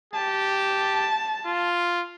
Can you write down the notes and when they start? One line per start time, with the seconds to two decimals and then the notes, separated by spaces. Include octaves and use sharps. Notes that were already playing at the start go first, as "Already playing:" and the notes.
0.13 G4 A5
1.46 F4